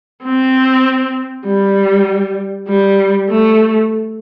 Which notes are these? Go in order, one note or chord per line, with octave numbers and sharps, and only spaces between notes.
C4
G3
G3
A3